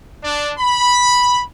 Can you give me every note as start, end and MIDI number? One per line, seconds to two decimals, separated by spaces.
0.22 0.52 62
0.58 1.42 83